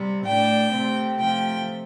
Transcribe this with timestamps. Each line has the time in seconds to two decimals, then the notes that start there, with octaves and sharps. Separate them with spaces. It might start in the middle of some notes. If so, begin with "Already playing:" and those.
Already playing: C3 G3 C4
0.25 A2 A3 D4 G5
0.73 C3 A3 C4
1.20 C3 F3 A3 G5